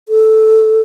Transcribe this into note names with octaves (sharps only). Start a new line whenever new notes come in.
A4